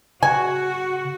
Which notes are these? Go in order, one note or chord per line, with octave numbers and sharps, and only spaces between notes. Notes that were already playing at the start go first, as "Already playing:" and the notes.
C#3 F#4 G#5